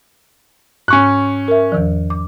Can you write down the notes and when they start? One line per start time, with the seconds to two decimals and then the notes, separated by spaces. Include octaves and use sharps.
0.88 G#2 C#4 C#6 F#6
1.48 A#4 E5
1.72 E2 D#3 F3
2.10 D6